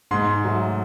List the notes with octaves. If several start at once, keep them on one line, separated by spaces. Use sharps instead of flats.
G#2 C6
F#3 A3